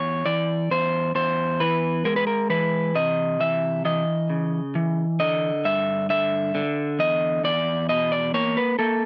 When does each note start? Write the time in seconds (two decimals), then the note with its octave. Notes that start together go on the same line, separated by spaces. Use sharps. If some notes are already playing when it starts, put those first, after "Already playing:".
Already playing: E2 C#5
0.26 E3 D5
0.71 E2 C5
1.15 E2 C5
1.60 E3 B4
2.05 G#3 A#4
2.16 B4
2.27 A#4
2.50 E3 B4
2.95 C3 D#5
3.40 E3 E5
3.85 E3 D#5
4.30 C#3
4.75 E3
5.20 D3 D#5
5.65 G2 E5
6.10 D3 E5
6.55 D3
6.99 E2 D#5
7.44 E2 D5
7.89 B2 D#5
8.12 D5
8.34 A#3 C#5
8.57 B4
8.79 A#3 A4